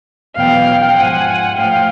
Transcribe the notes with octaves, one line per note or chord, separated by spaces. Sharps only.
E2 B2 F#3 F5 G5
G#2 F3 F#5 G#5
A2 F3 F5 G5